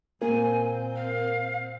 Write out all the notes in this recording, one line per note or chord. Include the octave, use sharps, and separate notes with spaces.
A#2 A#3 C4 A#4 G#5
F5